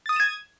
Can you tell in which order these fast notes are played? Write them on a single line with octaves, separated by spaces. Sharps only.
A6 D#6 D#7 E7 G#6